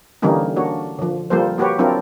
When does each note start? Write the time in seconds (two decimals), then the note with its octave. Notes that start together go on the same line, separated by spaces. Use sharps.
0.22 D3 E3 G3 A#3 C#4 D#4
0.56 A#3 D4 F#4 C#5
0.99 D3 F3
1.30 F3 G3 A#3 A4 C5
1.58 A#3 F#4 G4 B4 C#5
1.79 F#3 C4 D4 E4 F4 A#4